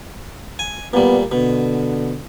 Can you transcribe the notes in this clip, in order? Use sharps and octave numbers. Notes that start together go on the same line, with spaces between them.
G#5
A#2 G3 B3
B2 D3